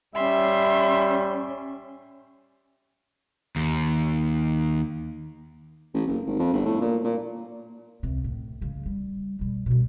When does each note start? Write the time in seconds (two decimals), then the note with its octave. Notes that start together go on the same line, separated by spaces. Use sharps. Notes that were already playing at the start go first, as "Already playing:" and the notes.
0.15 G3 C#4 E5 C6
3.56 D#2
5.94 A1
6.07 F#1
6.27 G#1
6.39 F2
6.53 G1
6.65 A2
6.81 A#2
7.04 A#2
8.03 C#2 C3
8.24 A2
8.62 C#3 G#3
8.86 G3
9.39 B2 G3
9.66 B2 G3